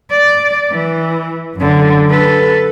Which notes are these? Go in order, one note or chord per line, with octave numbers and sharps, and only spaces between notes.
D5
E3
F#2 D3
A4 B4